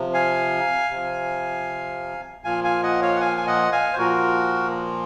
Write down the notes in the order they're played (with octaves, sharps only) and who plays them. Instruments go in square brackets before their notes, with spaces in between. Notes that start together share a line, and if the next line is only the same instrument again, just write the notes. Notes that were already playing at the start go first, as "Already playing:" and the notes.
Already playing: [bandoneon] C3 F3
F5 G#5
C3 F3
A#2 F3 F5 G#5
F5 G#5
D#5 F#5
C#5 F5
F#5
F5 G#5
G#5
D#5 F#5
F5 G#5
C5
A#2 F3 F#4 A#4